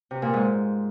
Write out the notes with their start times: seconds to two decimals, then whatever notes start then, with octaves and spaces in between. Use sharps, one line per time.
0.11 C3
0.22 A#2
0.33 G#2